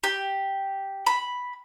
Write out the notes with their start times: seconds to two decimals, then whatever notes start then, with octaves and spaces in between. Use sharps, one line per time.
0.04 G4
1.07 B5